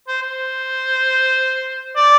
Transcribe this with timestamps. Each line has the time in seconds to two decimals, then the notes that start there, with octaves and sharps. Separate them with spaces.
0.08 C5
0.22 C5
1.97 D5